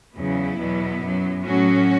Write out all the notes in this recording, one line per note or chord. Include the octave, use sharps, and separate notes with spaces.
E2 C#3 F#3 B3 E4
E2 B2 F#3
F#2 F#3
A2 F#3 C#4 F#4